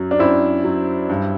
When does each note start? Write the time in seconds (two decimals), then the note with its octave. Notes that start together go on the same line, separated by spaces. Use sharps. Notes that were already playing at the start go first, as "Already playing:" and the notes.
Already playing: F#2 F#3
0.11 D4
0.19 F#2 C4 E4
0.64 F#3
1.09 G2